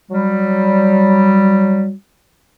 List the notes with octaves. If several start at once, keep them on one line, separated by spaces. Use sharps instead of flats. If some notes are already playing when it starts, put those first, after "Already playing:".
F#3 G3